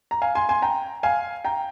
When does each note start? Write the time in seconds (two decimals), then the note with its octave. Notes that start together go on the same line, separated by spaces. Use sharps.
0.11 A#5
0.22 F5 G#5
0.35 G#5 C6
0.49 G#5 C6
0.62 G5 A#5
1.03 F5 G#5
1.45 G5 A#5